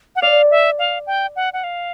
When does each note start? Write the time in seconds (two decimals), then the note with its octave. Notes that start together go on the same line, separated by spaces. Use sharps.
0.16 F#5
0.22 D5 F5
0.51 E5
0.79 F5
1.07 G5
1.36 F#5
1.53 F#5
1.64 F5